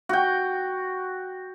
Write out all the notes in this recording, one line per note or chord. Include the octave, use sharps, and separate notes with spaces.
F#4 G5